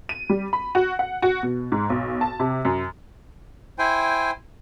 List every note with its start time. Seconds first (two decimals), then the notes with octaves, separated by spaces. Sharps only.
0.09 D#7
0.30 G3
0.53 B5
0.75 F#4
0.99 F#5
1.22 F#4
1.43 B2
1.72 G#2
1.90 B1
2.21 A5
2.40 C3
2.65 F#2
3.79 E4 C5 G5 G#5